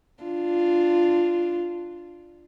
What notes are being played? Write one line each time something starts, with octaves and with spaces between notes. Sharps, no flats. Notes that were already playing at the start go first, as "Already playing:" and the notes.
D4 F4